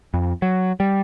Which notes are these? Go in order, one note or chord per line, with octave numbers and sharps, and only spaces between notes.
F2
F#3
G3